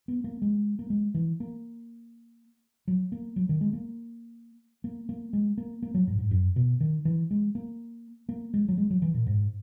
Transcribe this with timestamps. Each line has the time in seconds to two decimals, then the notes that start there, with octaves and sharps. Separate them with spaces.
0.08 B3
0.24 A#3
0.42 G#3
0.79 A#3
0.90 G#3
1.14 E3
1.40 A#3
2.88 F#3
3.12 A#3
3.36 F#3
3.49 D#3
3.61 G#3
3.73 A#3
4.84 A#3
5.09 A#3
5.33 G#3
5.58 A#3
5.82 A#3
5.94 F#3
6.07 G#2
6.19 G#2
6.31 F#2
6.56 B2
6.80 D#3
7.05 E3
7.31 G#3
7.55 A#3
8.29 A#3
8.54 G#3
8.68 F#3
8.77 G#3
8.90 F#3
9.02 E3
9.14 A#2
9.27 G#2